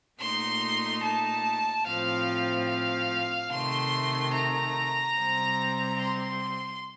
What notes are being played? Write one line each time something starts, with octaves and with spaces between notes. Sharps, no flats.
A#2 A3 D#4 C6
A5
A2 F3 C4 F5
F5
C3 D#3 A3 C6
A#5
C3 G3 C4
C6